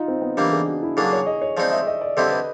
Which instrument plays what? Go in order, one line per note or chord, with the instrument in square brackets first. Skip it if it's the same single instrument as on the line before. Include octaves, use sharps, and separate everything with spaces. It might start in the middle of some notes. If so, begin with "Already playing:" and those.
Already playing: [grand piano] D#4 F4
C4
B3
[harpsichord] E3 G3 A#3 [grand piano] D4
[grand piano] G#4
F#4
E4
[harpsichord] C#3 F#3 A#3 D4 [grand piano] G#4
[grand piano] C#5
D#5
C#5
[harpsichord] F3 G#3 C4 D#4 [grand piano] D5
[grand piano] E5
D#5
D5
[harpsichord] D3 G3 C4 E4 [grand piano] D#5
[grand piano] B4